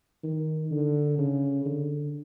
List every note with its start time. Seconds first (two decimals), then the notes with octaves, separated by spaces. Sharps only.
0.24 D#3
0.71 D3
1.18 C#3
1.66 D3